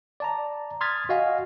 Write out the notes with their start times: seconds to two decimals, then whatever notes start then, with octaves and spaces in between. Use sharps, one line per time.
0.20 D5 A5 A#5
0.81 C6 D#6 F6 G#6 A6 B6
1.09 F#4 D#5 F5 G#5